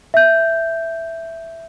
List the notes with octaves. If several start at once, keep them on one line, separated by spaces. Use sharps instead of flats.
E5 G6